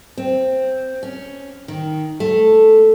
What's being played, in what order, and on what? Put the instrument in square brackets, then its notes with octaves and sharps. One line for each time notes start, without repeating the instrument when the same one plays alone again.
[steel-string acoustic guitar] C4
C#4
D#3
A3